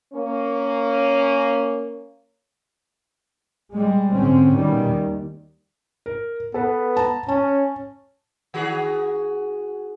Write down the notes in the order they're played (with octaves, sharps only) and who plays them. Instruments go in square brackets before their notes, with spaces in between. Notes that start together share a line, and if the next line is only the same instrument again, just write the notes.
[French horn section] A#3 C#4
[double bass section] G3 G#3
G#2 D3 C4 C#4
B2 D#3 G3
D#2
[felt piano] A#4
[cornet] B3 [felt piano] A4 B4
[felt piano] A5 A#5
[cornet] C#4 [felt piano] A5
[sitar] D#3 F#4 G#4